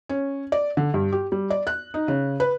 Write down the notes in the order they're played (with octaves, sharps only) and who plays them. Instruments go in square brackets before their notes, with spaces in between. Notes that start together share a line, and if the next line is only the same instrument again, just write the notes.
[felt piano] C#4
D5
D3
G2
G4
G3
D5
F#6
D#4
C#3
B4